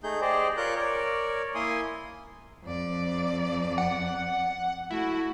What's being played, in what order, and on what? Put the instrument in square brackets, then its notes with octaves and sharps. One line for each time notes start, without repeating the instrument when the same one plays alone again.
[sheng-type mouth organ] A3 D#4 G#4 G6
G4 G#4 C5 D5 D#5
F4 A#4 C#5 D5 F#6 G6
A#4 C#5 D5
A#3 E4 G#5 C6 D#6
[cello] F2 D5
[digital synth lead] F#5
[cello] A3 F#4 [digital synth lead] E4